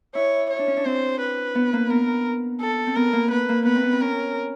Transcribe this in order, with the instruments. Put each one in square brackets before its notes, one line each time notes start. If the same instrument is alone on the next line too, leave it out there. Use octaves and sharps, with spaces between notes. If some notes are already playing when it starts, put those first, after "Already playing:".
[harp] E4 [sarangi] C#5
[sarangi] C#5
[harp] D4
C#4
D4
[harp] C4 [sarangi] C5
[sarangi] B4
[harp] B3
A#3
[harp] B3 [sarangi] A#4
[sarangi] A4
[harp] C4
[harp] B3 [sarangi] A#4
[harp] A#3
[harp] B3 [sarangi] B4
[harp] A#3
[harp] B3 [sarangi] B4
[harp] C4
B3
C4
[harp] C#4 [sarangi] A#4